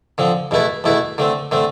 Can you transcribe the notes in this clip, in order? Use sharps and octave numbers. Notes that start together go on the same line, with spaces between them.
D3 F3 C4
E2 B2 A3 E4 B4
E2 B2 A3 E4 B4
D3 A3 C4
D3 A3 C4